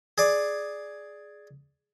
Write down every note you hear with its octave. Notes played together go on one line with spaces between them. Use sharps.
G#4 D5